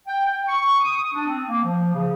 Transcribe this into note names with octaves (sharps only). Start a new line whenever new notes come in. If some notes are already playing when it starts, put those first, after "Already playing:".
G5
G5
C#6
D#6
D4
C4
A#3
F3
C#3